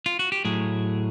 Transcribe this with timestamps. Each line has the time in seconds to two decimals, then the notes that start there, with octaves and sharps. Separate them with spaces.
0.06 F4
0.19 F#4
0.32 G4
0.45 A2 F#3 G#4